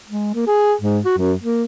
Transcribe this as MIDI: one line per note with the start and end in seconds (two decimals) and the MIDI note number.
0.08 0.31 56
0.35 0.45 58
0.47 0.73 68
0.81 0.99 44
1.05 1.14 66
1.18 1.33 42
1.42 1.64 58